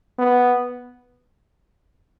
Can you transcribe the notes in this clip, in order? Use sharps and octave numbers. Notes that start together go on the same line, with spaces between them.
B3